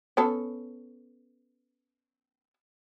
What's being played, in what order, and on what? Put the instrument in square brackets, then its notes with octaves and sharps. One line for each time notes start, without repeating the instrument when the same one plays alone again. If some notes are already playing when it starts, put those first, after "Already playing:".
[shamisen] B3 C#4 A4